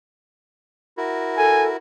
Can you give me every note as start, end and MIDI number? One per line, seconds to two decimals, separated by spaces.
0.97 1.77 64
0.97 1.77 66
0.97 1.77 70
1.38 1.68 69
1.38 1.65 80